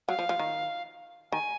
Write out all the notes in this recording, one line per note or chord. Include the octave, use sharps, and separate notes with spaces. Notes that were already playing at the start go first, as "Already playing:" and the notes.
F#3 F5
F3
F3
D#3
D#3 G#5